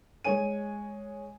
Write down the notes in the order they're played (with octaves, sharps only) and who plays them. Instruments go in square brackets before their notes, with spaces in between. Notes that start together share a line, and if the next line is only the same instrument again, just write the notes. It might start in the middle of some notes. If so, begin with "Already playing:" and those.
[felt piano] G#3 C#5 G#5 D#7